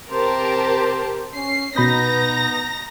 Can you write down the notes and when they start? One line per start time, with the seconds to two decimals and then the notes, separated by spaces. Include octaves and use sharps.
0.12 C3 G4 A#4 C5 A5
1.35 C#4 C7
1.76 B2 B3 D#4 A#5 B5 G6 A#6